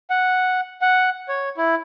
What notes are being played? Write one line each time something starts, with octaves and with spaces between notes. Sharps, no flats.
F#5
F#5
C#5
E4